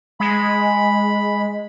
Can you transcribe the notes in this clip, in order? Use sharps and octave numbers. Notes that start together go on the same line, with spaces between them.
G#3 B5